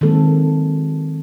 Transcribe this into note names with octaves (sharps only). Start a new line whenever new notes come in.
D#3 F#3 G#3 A#3 C4 A4